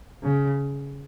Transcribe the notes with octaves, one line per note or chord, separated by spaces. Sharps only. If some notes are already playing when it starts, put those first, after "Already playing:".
C#3